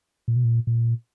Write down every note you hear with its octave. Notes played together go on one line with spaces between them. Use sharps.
A#2
B2
A#2
A#2